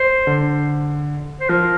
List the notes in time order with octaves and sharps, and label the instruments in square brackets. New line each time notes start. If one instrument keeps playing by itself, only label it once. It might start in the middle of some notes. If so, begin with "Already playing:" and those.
Already playing: [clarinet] C5
[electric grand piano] D3
[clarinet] C5
[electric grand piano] F3 [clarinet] A#4